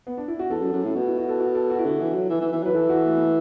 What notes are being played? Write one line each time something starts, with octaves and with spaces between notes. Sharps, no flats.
B3
D4
E4
F#4
E2 A4
F#2
F#2
A2
B2 F#4
E4
F#4
A4
F#4
A4
F#4
E4
D3 F#4
E3
F#3
E3
E3
E3
F#3 B4
E3 A4
F#4
A3
B3
A3